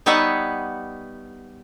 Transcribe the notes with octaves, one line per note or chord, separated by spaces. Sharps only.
G3 B3 D#4 C#5 E5 F#5